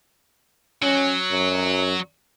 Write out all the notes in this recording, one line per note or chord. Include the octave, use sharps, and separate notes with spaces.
F#3 C#4
F#2